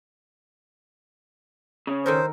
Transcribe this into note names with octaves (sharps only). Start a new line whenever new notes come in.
C#3 C#4
D#3 A4 A#4 C5